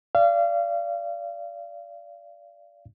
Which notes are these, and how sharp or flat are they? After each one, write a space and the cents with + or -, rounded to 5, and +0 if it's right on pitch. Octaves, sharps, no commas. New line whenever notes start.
D5 -15 F5 -30